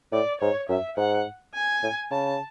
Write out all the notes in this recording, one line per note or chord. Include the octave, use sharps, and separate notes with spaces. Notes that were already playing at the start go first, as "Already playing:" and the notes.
A2 D5
G#2 C#5
F#2 E5
G#2 F#5
G#5
A2
C#3 A5